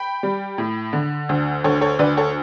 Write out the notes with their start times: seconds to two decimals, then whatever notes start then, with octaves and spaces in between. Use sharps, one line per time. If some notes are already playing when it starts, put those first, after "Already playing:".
Already playing: G5 B5
0.23 G3
0.58 A2
0.93 D3
1.29 D2
1.64 D2 A4 C#5
1.81 A4 C#5
1.99 D2 B4 D5
2.17 A4 C#5